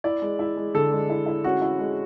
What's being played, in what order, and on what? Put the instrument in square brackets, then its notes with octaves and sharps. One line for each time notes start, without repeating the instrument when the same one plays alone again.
[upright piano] E4 [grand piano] D5
[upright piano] G#3
E4
G#3
[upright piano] D3 [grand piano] A4
[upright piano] G#3
E4
E4
[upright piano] C#4 [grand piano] F#4
[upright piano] E4
G#3